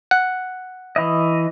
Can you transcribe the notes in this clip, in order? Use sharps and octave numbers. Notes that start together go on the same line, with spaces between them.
F#5
E3 D#5